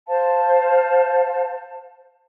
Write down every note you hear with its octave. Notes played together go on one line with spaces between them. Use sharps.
C5 F5 A5